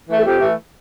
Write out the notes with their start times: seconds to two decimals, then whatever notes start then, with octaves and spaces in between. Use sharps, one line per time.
0.09 E3 A3
0.17 A4
0.25 F2 G4
0.40 E3 A3